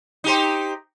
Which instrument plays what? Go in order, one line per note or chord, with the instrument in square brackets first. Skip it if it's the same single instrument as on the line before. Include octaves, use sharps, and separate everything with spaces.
[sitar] D#4 G4 C5